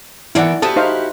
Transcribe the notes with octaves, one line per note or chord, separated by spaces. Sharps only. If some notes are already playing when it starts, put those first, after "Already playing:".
B2 D#3 E3 E4 D5 F#5
E4 F#4 G4 A4 A5 D#6
D#4 C5 F5